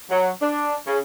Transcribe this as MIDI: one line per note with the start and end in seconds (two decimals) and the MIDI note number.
0.10 0.29 54
0.41 0.76 62
0.87 0.98 49